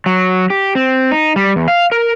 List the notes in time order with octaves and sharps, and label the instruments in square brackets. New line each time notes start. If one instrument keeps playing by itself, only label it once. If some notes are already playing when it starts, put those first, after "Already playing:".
[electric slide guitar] F#3
G4
C4
D#4
G3
E2
F5
A#4